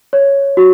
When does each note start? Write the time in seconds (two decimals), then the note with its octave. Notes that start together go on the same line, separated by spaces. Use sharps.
0.13 C#5
0.57 F#4